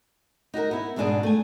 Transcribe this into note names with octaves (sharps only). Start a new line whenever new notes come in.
D#4 F#4 G4 A#4
B3 E4
E2 G#2 B2 D4 G#4 G#5
A3 G#5